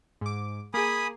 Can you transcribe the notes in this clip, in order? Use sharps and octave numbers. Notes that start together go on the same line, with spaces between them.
G#2 D6
A#3 G#4 G#5 B5 D#6